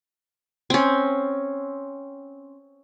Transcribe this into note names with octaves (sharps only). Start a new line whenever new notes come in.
C4 C#4